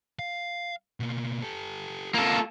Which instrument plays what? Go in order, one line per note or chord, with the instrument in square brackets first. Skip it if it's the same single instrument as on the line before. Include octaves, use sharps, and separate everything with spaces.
[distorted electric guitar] F5
B2 A#3
G4 A4
[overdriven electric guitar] A#3 A4 [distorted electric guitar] F4